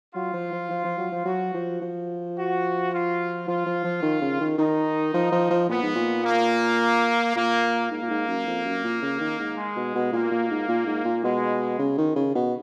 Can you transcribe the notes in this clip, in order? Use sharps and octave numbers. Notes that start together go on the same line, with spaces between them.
F#3 F4
F3
F3
F3
F3
F#3
F3
F#3 F#4
F3
F3
F#4
F4
F3 F4
F3
F3
D#3
C#3
D#3
D#3 D#4
F3
F3
F3
A#2 B3
G#2
A#2
A#3
A#2 A#3
G#2 A#3
A#2
G#2
F#2
F2
F#2
A#2
C#3
D#3
G#2
G#3
B2
B2
A#2 A#3
A#2
G#2
A#2
G#2
A#2
B2 G#3
C#3
D#3
C#3
B2